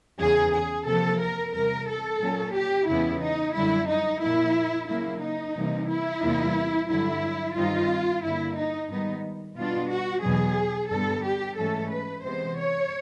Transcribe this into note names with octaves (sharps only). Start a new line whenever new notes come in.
E2 C#3 E3 G#4
G#4
C3 F3 A#3 A4
A#4
E2 C3 E3 G3 A#4
A4
A#2 F#3 A#3 C#4
G4
E2 C#3 E3 G#3 B3 E4
D#4
F#2 D3 G3 E4
D#4
A#2 F3 A#3 E4
C#3 F#3 A#3 E4
D#4
C3 E3 G3 A#3
E4
E2 C3 E3 G3 A#3
G2 D3 F#3 E4
G2 D#3 G3 C4 D#4 F4
G2 D3 G3 A#3 E4
D#4
G#2 D#3 G3 B3 D#4
B2 G3 B3 D4 F4
F#4
E2 B2 F#3 G#4
G2 D3 G3 B3 A4
G4
G#2 E3 A3 C#4 A4
B4
C3 E3 G#3 B3 C5
C#5